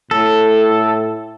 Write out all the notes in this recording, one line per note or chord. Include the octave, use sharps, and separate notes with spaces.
A2 A4